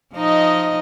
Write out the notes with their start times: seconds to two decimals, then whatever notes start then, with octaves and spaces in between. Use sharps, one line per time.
0.14 F3 D#4 D#5